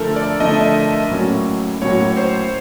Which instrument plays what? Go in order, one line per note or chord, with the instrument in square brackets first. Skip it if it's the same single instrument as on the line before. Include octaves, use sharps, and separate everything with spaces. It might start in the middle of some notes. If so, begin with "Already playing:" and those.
Already playing: [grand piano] D3 F3 A3 [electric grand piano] A4 A#4
[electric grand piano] D5
[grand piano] D3 F3 A3 [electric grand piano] D#5
[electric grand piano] E5
D#5
[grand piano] A2 F#3 A#3 C#4 F#4
[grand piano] A2 F#3 A#3 C#4 F#4 [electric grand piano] C#5
[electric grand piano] C#5
C5